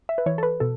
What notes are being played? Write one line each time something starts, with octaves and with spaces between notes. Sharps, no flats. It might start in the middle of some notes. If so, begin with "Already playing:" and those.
E5
B4
E3 C#5
A4
B4
B2 A4